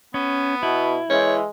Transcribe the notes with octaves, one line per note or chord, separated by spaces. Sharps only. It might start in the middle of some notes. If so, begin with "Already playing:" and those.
B3 C#4
B2 E4
E3 G#3 C#5